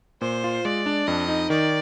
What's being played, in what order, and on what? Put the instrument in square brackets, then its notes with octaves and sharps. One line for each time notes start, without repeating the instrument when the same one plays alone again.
[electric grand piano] A#2 [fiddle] C5
[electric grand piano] F4
[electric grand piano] G#3 [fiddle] D5
[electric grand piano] D4
[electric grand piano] F2 [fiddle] D#5
[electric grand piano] D#4
[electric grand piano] D#3 [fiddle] D5